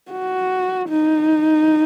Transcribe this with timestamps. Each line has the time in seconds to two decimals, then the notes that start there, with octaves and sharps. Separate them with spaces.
0.12 F#4
0.89 D#4